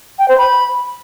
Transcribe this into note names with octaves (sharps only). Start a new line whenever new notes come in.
G5
C5
B5